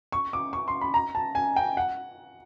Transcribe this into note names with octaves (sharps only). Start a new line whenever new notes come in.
C#6
D6
C#6
C6
B5
A#5
A5
G#5
G5
F#5